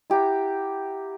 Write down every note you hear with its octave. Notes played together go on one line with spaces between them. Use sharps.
E4 G4 F#5 A#5